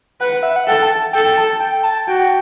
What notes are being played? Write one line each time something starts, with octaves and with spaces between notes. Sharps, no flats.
B4 F#5
E5
F#5
A4 G5
A5
A4 G5
A5
G5
A5
F#4 G5